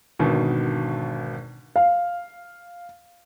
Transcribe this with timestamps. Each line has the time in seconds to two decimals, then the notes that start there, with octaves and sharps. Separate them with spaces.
0.19 G#1 B2 D3 D#3
1.76 F5